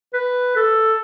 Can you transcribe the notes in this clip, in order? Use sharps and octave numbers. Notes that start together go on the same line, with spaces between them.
B4
A4